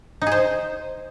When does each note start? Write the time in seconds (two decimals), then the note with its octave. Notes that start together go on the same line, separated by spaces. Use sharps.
0.22 D#4
0.27 G#4
0.32 C5